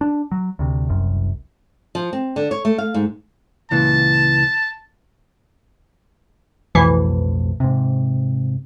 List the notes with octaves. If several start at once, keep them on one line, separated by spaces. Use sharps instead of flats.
D4
F#3
D2 C3
F#1 C2 F#2
F3
C4
D3
C#5
A3
F5
G#2
C#2 A#2 E3 A5
B1 F2 A2 E3
G#2 C3